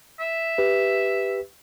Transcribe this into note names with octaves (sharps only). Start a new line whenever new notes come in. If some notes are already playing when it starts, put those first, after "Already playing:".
E5
G4 B4